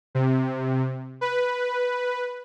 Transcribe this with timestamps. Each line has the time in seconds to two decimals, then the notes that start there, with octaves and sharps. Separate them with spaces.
0.15 C3
1.21 B4